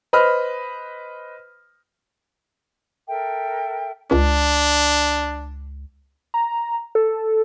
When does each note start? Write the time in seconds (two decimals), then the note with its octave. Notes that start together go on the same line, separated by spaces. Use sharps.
0.13 B4 C5 D#5 B5 F6
3.08 A4 A#4 E5 G5
4.11 C#2 D4
6.34 A#5
6.95 A4